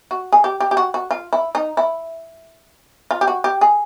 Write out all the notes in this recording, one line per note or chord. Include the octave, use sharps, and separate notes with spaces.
F#4
G#4
G4
G4
G4
F#4
F#4
F4
E4
D#4
E4
F4
G4
F#4
G4
G#4